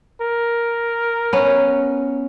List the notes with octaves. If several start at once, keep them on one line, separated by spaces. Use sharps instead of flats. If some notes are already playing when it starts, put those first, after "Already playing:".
A#4
B3 C#4